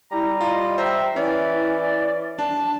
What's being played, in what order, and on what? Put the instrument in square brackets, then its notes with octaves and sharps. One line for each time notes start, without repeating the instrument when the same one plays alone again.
[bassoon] G3 [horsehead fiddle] E4 [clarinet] A#5
[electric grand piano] F4 [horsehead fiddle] D#5
[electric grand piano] C5 A#5 [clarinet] E5 [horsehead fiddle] G5
[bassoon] E3 [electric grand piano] C#4 [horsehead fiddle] E4 [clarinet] D5
[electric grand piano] D4 [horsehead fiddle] A5